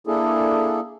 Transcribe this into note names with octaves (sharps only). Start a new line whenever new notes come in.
A#3 D4 E4 G#4 A4